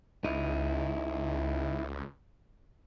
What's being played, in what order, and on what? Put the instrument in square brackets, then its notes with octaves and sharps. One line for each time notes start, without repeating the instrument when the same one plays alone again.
[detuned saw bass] C#2 [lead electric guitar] D#4 E4